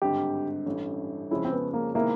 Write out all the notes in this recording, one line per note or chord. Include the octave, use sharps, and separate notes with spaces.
G#1 G2 D3 G4
A1 G2 E3 A3 C#4
F2 C#3 F3 G#3 C#4 E4
C4
B3
A#3
C3 D#3 G#3 A#3 B3 E4